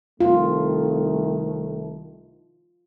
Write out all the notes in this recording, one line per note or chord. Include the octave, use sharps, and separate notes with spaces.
C2 D#3 A3 F4